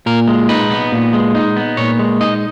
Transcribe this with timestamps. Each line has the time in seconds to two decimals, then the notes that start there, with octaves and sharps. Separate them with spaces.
0.06 A#2 A#4
0.28 G#3
0.49 D#4 B4
0.70 B3
0.92 A#2
1.13 G#3
1.35 D#4
1.56 B3
1.77 A#2 C#5
1.99 G#3
2.21 D#4 D#5